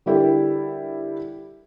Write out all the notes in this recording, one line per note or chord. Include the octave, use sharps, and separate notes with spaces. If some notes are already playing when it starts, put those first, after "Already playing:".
D3 G3 E4 G4 A4 A#4